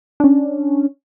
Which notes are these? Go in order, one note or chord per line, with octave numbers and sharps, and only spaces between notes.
C#4 D4